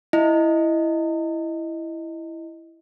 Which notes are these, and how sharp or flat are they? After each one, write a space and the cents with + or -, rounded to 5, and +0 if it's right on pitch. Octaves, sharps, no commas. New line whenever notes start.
E4 +5 D#5 +0